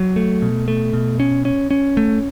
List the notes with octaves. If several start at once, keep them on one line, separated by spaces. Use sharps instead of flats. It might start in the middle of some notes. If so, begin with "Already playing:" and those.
Already playing: F#3
A3
B2
A3
B2
C#4
C#4
C#4
A3